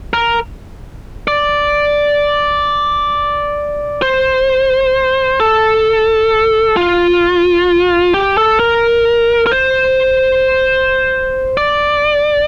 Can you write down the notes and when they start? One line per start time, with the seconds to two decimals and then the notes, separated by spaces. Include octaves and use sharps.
0.13 A#4
1.28 D5
4.02 C5
5.40 A4
6.77 F4
8.14 G4
8.38 A4
8.60 A#4
9.47 A#4
9.52 C5
11.57 D5